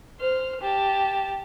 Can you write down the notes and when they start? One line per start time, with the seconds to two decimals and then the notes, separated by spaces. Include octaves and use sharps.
0.19 C5 F6
0.61 G4 A5